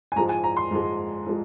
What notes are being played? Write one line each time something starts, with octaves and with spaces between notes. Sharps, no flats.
G#5
G#2 F3 G#3 A#5
G#5
A#5
C6
G#2 F3 G#3
F3 G#3